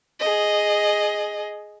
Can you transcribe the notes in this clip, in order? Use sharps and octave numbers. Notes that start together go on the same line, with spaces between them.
G#4 D#5